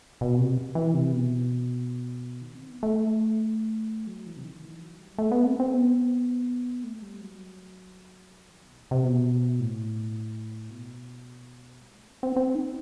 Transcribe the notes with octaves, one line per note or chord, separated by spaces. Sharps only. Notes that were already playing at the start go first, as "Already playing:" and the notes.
B2
C3
E3
C3
B2
D#3
C4
B3
A3
F#3
E3
C3
D#3
E3
F#3
G3
A3
B3
C4
C4
B3
A3
G3
F#3
D#3
B2
A2
C3
B2
A2
B2
G3
A3
C4
C4
C4
D#4